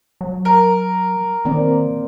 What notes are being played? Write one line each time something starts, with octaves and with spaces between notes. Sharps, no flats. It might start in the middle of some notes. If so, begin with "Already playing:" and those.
F#3
A#4
D#3 A#3 C4 D5